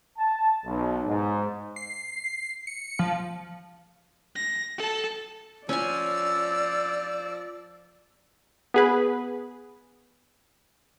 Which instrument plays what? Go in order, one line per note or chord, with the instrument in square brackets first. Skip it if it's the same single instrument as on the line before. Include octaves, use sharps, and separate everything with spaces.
[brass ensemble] A5
B1
G#2
[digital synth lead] C7
C#7
F3
[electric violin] A#6
A4 A5
[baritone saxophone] F3 [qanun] C#4 G#5 [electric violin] D5 [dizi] E6
[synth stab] B3 G#4 B4